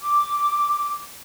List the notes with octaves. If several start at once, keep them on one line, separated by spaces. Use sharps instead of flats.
D6